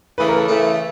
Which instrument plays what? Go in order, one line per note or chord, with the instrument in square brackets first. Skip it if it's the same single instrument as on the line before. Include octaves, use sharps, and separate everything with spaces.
[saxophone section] C#3 E3 A3 [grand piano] B4
[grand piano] A#4
A4
[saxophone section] C#3 E3 A3